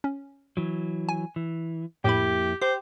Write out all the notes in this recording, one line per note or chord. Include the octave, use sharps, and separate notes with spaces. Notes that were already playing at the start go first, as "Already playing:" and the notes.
C#4
E3 F#3
G#5
E3
F2 A2 A#3 E4 G4 B5
G4 C5 G5 D6